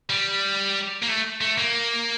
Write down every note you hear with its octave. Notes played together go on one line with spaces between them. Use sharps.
G3
A#3
A3
A3
A#3